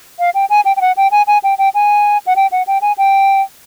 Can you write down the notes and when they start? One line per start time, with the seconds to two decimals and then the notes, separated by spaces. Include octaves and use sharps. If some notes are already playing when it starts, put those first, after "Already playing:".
0.19 F5
0.35 G5
0.50 G#5
0.65 G5
0.77 G5
0.81 F#5
0.97 G5
1.11 G#5
1.27 G#5
1.44 G5
1.58 G5
1.75 G#5
2.27 F#5
2.36 G5
2.52 F#5
2.67 G5
2.82 G#5
2.98 G5